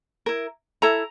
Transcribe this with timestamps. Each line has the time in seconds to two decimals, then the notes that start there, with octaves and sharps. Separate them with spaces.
0.26 E4 A#4
0.82 E4 A4 A#5